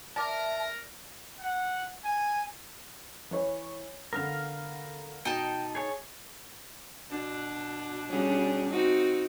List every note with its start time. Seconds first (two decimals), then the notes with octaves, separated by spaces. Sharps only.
0.16 A#4 D5 E5 A5 D6
1.39 F#5
2.05 G#5
3.31 E3 C#5
4.13 D3 B3 A#4 F5
5.25 B2 D#4 G5 A5
5.75 G#4 C#5
7.11 B2 D4
8.09 G3 C#4 G#4
8.70 C4 D#4 F#4